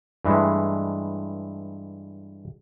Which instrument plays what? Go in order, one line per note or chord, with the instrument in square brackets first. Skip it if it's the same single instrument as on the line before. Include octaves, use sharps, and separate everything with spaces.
[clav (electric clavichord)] G2 E3 G#3 A3